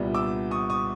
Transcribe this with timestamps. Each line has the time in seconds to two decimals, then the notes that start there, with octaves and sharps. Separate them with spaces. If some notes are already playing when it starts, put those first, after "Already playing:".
Already playing: C2 A#2 G3 B3 D4
0.14 D6 E6
0.51 C#6 D#6
0.70 C#6 D#6